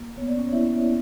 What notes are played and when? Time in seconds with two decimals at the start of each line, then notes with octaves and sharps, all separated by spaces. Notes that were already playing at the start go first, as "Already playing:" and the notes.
Already playing: A#3
0.17 B3 C#5
0.27 D5
0.36 C#4 C#5
0.52 B3 E4 E5